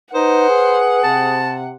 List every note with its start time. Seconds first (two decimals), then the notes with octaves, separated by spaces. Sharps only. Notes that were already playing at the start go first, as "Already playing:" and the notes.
0.14 D#4 B4 C5 F#5
0.49 G#4
1.04 C3 A5